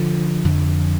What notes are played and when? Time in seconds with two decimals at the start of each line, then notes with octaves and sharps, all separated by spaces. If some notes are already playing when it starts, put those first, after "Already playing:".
Already playing: D3 F3
0.44 F2 D3